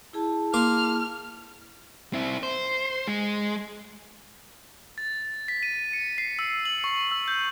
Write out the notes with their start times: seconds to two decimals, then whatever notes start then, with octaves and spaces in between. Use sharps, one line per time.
0.13 E4 G#4 A5
0.54 A#3 C6 D6 F6
2.13 C4 E4
2.43 C5
3.07 G#3
4.98 A6
5.48 B6
5.63 D#7
5.93 C#7
6.18 C7
6.39 E6
6.65 F#7
6.84 C#6
7.11 E6
7.28 G6